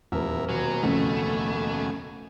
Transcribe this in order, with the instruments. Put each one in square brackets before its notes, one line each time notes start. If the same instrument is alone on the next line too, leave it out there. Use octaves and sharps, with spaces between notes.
[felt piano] D#1 F3 [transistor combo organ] E2 A#4 E5
[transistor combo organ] D#2 B2 G#5 [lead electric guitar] F#3
[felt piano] A1 F2 C#3 [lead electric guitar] A3